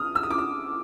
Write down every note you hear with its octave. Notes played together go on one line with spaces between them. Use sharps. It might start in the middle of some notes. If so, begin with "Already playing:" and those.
Already playing: D#6 F6
E6
D#6
D6
D#6